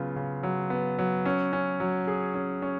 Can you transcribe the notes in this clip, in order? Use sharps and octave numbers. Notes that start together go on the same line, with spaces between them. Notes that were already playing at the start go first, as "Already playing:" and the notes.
Already playing: C#3 F#3 B3 F4
C#3
F#3
B3
F#3
C#4
C#4
F#3
G#4
C#4
C#4